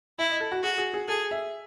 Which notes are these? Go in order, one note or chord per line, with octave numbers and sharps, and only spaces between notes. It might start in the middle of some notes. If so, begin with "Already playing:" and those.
E4 E5
D#5
A4
F#4
F#4 G#4
G#4
G#4
G#4 A4
E5